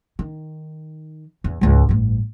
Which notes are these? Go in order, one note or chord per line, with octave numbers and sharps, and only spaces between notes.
D#3
E2
C#2 G#2
A1 G2